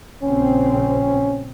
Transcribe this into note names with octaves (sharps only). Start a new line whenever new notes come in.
A#1 C#3 C4 C#4